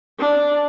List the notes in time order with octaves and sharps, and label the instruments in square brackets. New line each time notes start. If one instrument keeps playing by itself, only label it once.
[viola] D4